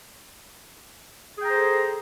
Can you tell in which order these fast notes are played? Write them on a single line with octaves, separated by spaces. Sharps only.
G#4 G5 A#5 C5 A4